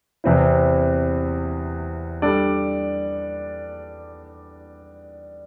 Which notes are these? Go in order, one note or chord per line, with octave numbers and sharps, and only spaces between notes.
E2 C3 E3 C4 E4
G3 D4 A4 D5